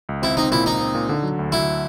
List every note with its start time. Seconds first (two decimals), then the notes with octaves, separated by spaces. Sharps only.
0.09 C#2
0.22 C4 E4
0.37 C4 D#4
0.51 A#2 E4
0.65 C4 D#4
0.81 C4
0.95 A#2
1.09 D3
1.23 F#3
1.39 D2
1.52 F#3 E4